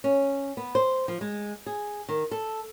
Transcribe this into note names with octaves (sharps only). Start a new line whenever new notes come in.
C#4
B3
C5
F3
G#3
G#4
D#3
A4